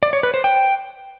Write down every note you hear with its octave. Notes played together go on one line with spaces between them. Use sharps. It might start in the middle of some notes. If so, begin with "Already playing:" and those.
D5
C#5
B4
C5
G5